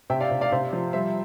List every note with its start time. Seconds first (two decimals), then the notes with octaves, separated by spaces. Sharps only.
0.10 C3 E5 G5
0.20 D5 F5
0.31 C3
0.41 D5 F5
0.52 C3 C5 E5
0.73 F3
0.93 G3 C5 E5